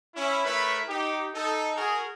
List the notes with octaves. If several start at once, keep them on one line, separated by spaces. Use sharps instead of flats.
C#4 E4
A3 E4 A#4 B4 C#5 E5
D#4 G4
D#4 A4
F#4 G#4 A#4